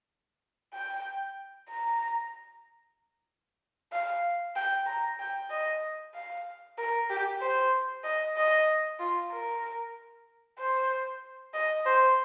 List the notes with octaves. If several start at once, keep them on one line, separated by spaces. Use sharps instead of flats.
G5
A#5
F5
G5
A#5
G5
D#5
F5
A#4
G4
C5
D#5
D#5
F4
A#4
C5
D#5
C5